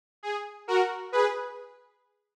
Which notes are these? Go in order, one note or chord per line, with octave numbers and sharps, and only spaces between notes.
G#4
F#4 A#4
G#4 B4